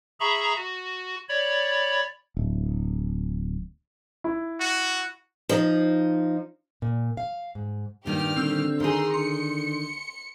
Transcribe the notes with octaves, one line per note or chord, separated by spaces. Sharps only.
G#4 E5 A#5 B5 C#6
F#4
C#5 D5 B5
D1
E4
F#4
F3 D#4
A#2
F5
G#2
G2 A#2 D#3 G3 G4 F6
D3 C4 E6
D#3 G#4 A#5 C6
D3 C6 C#7